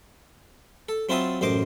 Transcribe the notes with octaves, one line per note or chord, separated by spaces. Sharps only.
A4
F#3 C4 E4 F4 A5 D#6
A1 F#2 C5 D#5 D6